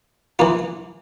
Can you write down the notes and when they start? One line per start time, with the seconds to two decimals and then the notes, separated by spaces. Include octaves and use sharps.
0.39 E3 A#3 F4